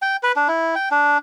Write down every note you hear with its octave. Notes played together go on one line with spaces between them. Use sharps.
G5
B4
D4
E4
G5
D4